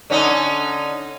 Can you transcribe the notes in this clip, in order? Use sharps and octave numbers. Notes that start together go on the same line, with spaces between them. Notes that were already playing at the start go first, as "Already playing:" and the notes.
D3 C#4 D#4